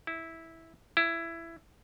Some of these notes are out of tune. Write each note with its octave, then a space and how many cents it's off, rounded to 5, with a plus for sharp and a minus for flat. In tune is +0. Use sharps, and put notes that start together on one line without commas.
E4 -10
E4 +15